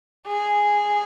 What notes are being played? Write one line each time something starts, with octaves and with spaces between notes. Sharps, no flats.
G#4